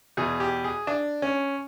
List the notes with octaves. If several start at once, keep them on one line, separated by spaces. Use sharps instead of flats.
E2 B2 G#4
G4
G#4
D4
C#4